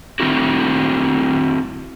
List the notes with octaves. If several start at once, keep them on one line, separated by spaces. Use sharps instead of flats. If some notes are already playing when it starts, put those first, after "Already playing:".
D#3 C4 E4 F#4